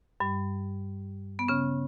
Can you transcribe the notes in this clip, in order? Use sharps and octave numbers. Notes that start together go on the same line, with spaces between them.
G2 G3
B3
C#3 C#4